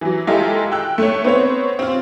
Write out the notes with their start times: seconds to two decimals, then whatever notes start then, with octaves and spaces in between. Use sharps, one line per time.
0.01 E3 F#3
0.27 G#3 E4 F4 G4 A4 A#4
0.72 G5 E6 F#6
0.98 A3 C#5
1.24 B3 C4 C5 C#5
1.79 C4 F4